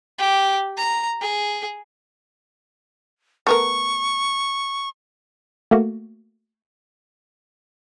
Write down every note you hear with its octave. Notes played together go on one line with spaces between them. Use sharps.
G4
A#5
G#4
A3 B3 A#4 C#6
A3 A#3 F#4